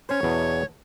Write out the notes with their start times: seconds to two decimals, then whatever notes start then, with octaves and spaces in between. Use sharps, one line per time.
0.09 C#4 C5 C#5
0.23 E2 B2